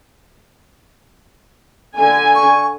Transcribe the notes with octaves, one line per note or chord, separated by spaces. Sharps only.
D3 G#5
C#6